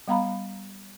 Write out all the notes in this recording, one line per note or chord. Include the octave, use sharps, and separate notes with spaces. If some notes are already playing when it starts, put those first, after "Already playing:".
G3 B3 F5 A#5 B5